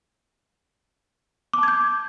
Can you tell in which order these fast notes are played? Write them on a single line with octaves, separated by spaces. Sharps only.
D6 A5 G#6 G6